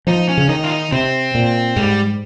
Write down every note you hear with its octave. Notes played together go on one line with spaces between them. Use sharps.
F3 D#4
C#4
C#3
D#3 D#4
F4
D#4
C3 C4
A#2
G#2 G3